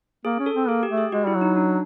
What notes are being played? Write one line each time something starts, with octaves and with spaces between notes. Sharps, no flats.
A#3 G#4
C#4
A4
C4
A#3 G#4
G4
A3
G#4
G#3 F#4
G3 E4
F#3
D#4
D4